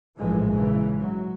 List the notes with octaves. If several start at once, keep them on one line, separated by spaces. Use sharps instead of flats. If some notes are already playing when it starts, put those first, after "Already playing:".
A#1 A2 E3 F3 G#3
G#2 C#3 E3
F#3